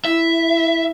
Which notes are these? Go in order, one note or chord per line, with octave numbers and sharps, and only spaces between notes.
E4 E5